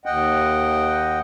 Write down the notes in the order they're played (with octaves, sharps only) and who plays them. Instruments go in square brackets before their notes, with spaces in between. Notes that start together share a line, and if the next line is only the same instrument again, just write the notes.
[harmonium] D#2 D#5 F#5 G5